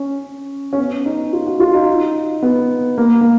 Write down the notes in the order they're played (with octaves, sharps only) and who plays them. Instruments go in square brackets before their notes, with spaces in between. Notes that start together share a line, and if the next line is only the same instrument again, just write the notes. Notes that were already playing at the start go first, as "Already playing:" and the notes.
Already playing: [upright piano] C#4
C#4
B3
D#4
F4
F#4
F4
D#4
B3
A#3
A#3